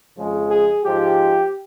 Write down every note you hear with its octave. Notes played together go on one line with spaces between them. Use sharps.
F2 C#3 F3 G#3
G#4
G#2 F3 G#3 G4